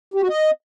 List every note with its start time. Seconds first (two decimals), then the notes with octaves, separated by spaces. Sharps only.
0.14 G4
0.22 F#4
0.29 D#5